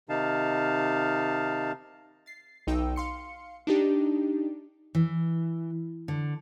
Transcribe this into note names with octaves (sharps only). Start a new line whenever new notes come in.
C3 D#3 D#4 F5 A5
A6 C7
B1 D#4 G5 E6
F5 C6 C#7
D4 D#4 G4
E3
D3